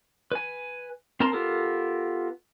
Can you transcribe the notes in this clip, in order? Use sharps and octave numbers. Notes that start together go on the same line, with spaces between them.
B4 G#5
C4 A#4 A5 A#5 C6
B3 F4 G4 A4 A#4